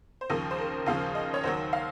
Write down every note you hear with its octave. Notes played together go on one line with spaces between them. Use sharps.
C5
D#2 C#3 F3 A#4
C5
A#4
D#2 C#3 F3 F5
D#5
C#5
D#2 D#3 F#3 C5
F5